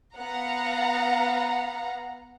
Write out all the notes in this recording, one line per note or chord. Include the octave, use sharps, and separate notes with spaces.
B3 F5 F#5 A#5